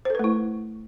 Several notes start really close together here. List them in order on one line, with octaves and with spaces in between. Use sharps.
C5 A4 B4 A3 E4